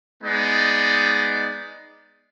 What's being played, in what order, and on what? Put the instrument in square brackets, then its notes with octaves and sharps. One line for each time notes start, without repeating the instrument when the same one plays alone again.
[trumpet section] G#3 B3 D#4 D5